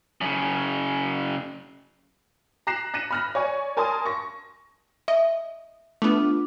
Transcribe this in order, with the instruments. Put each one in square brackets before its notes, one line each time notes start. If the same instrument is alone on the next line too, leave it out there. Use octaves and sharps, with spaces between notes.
[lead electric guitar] F#2 C#3
[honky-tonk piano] A#5 F#6 A#6 C7 E7
F#6 A#6 C#7 D#7 E7
B5 F6 A#6
C#5 D5 G#5 C#6
A#4 G#5 A5 C6 D#6
C#6 A#6
[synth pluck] D#5 [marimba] E5
[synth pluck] A3 B3 [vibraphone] D4 F4 D6